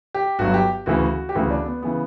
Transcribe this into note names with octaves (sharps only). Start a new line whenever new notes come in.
G4
G1 G2 F#3 F#4
G4
D2 C#3 E3 F#4
G4
D2 C#3 E3 F#4
D4
B3
C#3 E3 B3